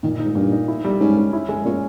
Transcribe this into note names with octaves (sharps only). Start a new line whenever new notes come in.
A#2 D#3
D#4
G#2
G2 A#2
D#4
E4
G3
G#2 C#4
C#4
E4
G#3
A#2 C#4